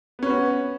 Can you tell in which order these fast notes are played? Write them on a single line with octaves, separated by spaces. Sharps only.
B3 C#4 B4 F#4